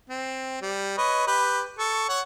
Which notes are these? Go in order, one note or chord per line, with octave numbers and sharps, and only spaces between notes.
C4
G3
B4 C#5 D#5
G4 B4
A4 C#6
C#5 F#5